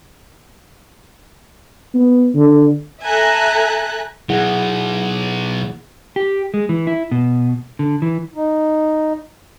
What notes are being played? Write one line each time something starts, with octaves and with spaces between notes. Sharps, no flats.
B3
D3
A4 E5 G#5 A#5 F#6
B2 F#3 E4 G#4 F#5
G4
G#3
E3
E4
B2
D3
E3
D#4